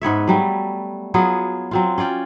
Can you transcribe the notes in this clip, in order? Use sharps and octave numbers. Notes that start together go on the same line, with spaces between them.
G#2 B3 C#5 E5
F#3 G3 A3
F#3 B3 F4 G#4
F#3 C4 F4
C#4 F4 D5 G5